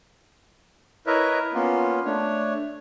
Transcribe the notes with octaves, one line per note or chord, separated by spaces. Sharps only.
E4 A#4 B4 C#5 D#5 E5
A#3 B3 C#4 F4
A3 D4 C#5